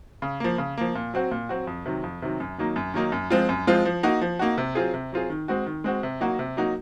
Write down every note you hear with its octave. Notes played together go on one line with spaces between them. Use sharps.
C#3
F3 A#3
C#3
F3 A#3
A#2
F#3 C4 F#4
A#2
F#3 C4 F#4
F2
C3 D#3 F#3
F2
C3 D#3 F#3
F#2
D#3 F#3 A#3 D#4
F#2
D#3 F#3 A#3 D#4
F#2
F3 G#3 C4 F4
F#2
F3 G#3 C4 F4
F3
A#3 D#4 F#4
F3
A#3 D#4 F#4
C3
F#3 C4 F4 G#4
C3
F#3 C4 F4 G#4
D#3
G#3 C4 F#4
D#3
G#3 C4 F#4
C3
F#3 A#3 D#4 F#4
C3
F#3 A#3 D#4 F#4